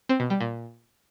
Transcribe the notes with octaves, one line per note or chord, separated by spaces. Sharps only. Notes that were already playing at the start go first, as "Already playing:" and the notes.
C4
B2
G3
A#2